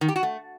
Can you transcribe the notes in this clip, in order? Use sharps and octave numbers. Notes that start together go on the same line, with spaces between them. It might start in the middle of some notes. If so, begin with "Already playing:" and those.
D#3
G4
F#4
A3